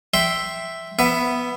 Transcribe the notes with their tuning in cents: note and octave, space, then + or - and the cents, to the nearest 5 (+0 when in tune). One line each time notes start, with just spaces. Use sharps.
E5 +0 G5 -10 C6 +0
B3 +0 E5 +15